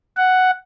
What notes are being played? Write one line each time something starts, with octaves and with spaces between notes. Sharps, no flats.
F#5